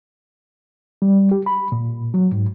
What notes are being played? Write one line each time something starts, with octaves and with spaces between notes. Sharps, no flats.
G3
G4
B5
A#2
F#3
G#2